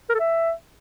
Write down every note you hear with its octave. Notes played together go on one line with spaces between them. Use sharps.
A#4
A4
E5